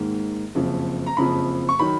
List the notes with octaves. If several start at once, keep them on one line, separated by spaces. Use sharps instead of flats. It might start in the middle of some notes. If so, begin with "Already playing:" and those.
Already playing: G#2 D#3 A#3
F#1 F2 C#3 F3
A#5
F#1 F2 C#3 F3 B5
C#6
D#3 F#3 B5